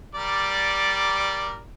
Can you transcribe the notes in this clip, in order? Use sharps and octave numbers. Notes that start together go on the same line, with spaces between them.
G3 A#4 D5